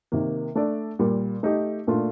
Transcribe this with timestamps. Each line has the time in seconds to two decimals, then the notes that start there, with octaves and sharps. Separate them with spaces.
0.12 C3 D#3 A#3
0.55 A3 D4 A4 D5
0.99 A#2 G3 A#3
1.43 A3 D#4 G4
1.87 A#2 A3 D4 F4